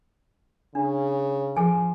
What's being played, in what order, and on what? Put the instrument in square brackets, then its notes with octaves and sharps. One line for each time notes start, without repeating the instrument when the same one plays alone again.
[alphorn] C#3 [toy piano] D4
[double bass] F3 [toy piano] G#4 G#5